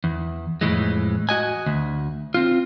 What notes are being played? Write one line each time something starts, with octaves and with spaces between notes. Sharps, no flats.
E2
F2 A2 E3 G#3
F#4 D#5 G#5
D2
C4 F4